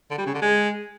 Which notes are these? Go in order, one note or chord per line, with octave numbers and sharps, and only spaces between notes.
D3
G3
C#3
D3
G#3